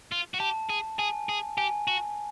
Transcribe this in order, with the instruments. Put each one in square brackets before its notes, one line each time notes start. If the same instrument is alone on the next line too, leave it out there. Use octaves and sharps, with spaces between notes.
[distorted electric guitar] F4
F#4
[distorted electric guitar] G4 [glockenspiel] A5
[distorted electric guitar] G#4
[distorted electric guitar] G#4 [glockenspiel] G#5
[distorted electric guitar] G#4
[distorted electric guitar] G4 [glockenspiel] G#5
[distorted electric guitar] F#4